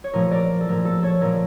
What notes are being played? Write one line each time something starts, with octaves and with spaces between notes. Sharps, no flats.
C#5
A#2 F3 A3 A#4
A#4 D5
A4
A#2 F3 A3 A#4
A4
A4 C#5
A#2 F3 A3 A#4 D5